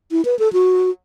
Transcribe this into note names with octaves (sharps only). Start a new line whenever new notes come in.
E4
B4
A4
F#4